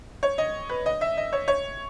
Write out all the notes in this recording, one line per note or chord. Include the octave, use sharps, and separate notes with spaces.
C#5
D#5
B4
D#5
E5
D#5
C#5
C#5